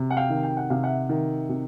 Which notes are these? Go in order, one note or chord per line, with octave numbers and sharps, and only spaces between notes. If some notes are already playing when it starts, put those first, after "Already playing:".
Already playing: C3
F#5
F5 G5
D#3
G5
F#5
C3 F5
E5 F#5
D#3
C3